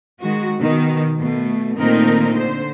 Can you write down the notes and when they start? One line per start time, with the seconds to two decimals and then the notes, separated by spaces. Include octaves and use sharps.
0.22 D#3 G#3 F#4
0.59 B2 D#3
1.18 B2 A3
1.78 A#2 D#3 A3 C4 D#4 A#4
2.33 D3 C5